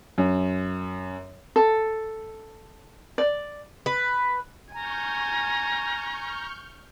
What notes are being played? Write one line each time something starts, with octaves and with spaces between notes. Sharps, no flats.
F#2
A4
D5
B4
G#5 A#5 C#6 F6 G6